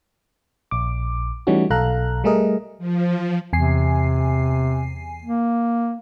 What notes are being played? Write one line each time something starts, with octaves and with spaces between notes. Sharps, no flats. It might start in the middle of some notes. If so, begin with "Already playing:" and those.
A#1 D6
E3 G3 A3 C#4 D#4 F#4
B1 A4 F5 A#5 F#6
G3 A3 G#4 A#4 D#5
F3
E2 C3 G#5 C7
A#3